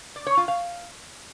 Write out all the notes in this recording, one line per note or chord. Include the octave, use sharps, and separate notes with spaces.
D5
C#5
F4
F5